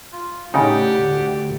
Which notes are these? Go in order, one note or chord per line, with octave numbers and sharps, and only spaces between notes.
F4
A2 C#3 D#4 G4 D5 F#5 G5
D2